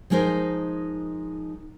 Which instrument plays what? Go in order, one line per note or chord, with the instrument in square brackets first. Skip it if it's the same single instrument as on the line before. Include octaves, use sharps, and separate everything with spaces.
[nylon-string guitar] F3 G#3 D#4 A#4 C5